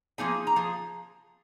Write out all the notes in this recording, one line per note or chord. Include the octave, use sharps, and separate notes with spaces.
F3 A#3 D#4 G#4 G#5
A#5
F3 G#4